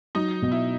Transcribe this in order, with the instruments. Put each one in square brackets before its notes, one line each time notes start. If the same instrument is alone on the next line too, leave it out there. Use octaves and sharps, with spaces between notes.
[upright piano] F#3 [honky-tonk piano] D#4
[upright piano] B2
[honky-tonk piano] E4